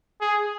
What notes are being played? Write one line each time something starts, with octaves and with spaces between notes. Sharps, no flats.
G#4